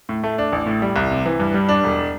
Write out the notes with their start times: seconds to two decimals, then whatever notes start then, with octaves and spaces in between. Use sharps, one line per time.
0.09 A2
0.24 A3
0.38 D4
0.52 A1
0.66 A2
0.82 G3
0.96 C2
1.11 C3
1.26 E3
1.40 G2
1.54 G3
1.69 D4
1.84 E1